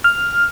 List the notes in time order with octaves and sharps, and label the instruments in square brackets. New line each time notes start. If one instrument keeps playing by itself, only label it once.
[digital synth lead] F6